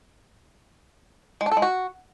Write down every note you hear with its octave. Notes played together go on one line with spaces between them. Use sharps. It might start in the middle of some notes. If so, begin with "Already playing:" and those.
G#3
D4
A4
G#3
F#4